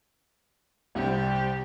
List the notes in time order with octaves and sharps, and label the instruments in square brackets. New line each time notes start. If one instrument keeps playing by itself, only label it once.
[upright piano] C2 C4 [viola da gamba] C3 G3 G4